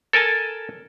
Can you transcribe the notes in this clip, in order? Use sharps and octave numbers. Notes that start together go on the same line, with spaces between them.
A4 A#4 G#5 A5